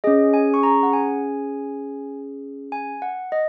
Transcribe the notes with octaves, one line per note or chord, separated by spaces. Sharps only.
C#4 G#4 D#5
G#5
C#6
A#5
F#5
G#5
G#5
F#5
D#5